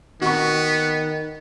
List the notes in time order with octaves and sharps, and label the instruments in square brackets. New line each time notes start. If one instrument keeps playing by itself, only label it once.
[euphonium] D#3 [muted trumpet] B3 [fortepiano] F#4 C#6